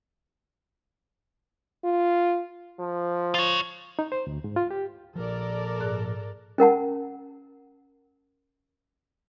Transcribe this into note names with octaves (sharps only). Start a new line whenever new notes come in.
F4
F3
F4 C#5
D#4
C5
D2
G#2
F4
G4
A#2 F3 A4 A#4 D5
G#2 G#4 F#6
C#4 A#4 F#5 A5